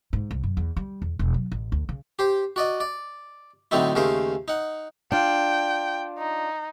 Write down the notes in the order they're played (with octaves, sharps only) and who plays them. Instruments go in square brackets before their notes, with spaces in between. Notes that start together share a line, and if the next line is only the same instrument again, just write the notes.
[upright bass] G#2
C2
F#2
E2
G3
E2
E1
F#3
A1
D2
C#3
[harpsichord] G4 C5
F#4 D5 D#5
D5
A2 D3 F#3 C4 D#4 E4
D#2 C#3 A3 A#4 C5 F5
D#4 F#5
[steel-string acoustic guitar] D4 F4 [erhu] G5
[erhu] D#4